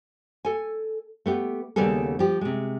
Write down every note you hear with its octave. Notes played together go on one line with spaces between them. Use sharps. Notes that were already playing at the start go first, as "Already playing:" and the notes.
A4 G#5
A3 B3 G4
D#2 C#3 G3 B3 G#4 A4
F3 G4
C3 G#3